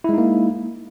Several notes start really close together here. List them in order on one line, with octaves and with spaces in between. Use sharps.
E4 G#3 D#4 A#3